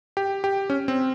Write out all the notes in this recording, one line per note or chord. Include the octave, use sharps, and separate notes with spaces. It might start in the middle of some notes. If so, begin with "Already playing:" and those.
G4
G4
C#4
C4